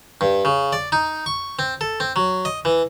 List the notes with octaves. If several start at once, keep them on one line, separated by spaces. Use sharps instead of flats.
G2
C#3
D5
D#4
C#6
C4
A4
C4
F#3
D#5
E3